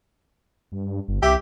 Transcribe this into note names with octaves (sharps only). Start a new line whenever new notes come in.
G2
G1
C2 G4 E5